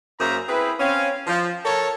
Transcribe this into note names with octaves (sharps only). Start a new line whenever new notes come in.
F#2 A#3 G#4 C5 E5 A#5
C4 E4 G#4 B4
C4 C#4 F5
F3
A4 A#4 C#5